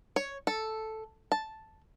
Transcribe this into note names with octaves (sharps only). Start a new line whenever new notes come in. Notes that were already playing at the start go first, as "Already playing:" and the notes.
C#5
A4
A5